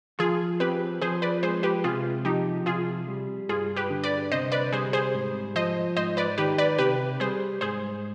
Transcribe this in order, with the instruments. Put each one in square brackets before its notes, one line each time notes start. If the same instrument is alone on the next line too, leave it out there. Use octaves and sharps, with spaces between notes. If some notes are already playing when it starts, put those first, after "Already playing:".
[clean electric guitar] F3 [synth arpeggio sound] F4 G#4
[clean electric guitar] C4 [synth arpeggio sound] G4 B4
[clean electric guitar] F3 [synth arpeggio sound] G#4 C5
[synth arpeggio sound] B4 D5
[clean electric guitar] G#3 [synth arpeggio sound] G#4 C5
[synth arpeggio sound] G4 B4
[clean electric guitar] C3 [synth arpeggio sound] F4 G#4
[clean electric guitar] F3 [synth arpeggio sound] D#4 G4
[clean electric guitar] C3 [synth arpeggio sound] F4 G#4
[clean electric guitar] G3
[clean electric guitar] G2 [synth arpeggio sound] F4 G#4
[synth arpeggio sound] G4 B4
[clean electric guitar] D3
[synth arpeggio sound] B4 D5
[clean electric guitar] C3 [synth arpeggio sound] C5 D#5
[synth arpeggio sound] B4 D5
[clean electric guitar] G3 [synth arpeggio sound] G#4 C5
[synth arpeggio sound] G#4 C5
[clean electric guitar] G#2
[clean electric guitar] F3 [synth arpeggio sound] C5 D#5
[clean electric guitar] G#2 [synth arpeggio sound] C5 D#5
[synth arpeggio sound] B4 D5
[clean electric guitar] D#3 [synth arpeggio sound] G4 B4
[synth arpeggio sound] B4 D5
[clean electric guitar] C3 [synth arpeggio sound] G4 B4
[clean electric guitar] G3 [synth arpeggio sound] G#4 C5
[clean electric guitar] G#2 [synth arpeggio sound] G#4 C5